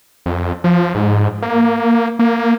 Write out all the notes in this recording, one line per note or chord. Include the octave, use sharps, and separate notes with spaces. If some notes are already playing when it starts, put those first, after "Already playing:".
F2
F3
G#2
A#3
A#3